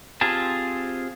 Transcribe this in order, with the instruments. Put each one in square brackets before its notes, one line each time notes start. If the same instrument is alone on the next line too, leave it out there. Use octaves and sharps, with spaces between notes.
[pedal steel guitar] C4 F4 G4 G#4 A5